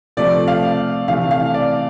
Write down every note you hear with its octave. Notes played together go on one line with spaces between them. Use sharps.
C3 F3 A3 D5
F5
C3 E3 A3 F5
F5
D5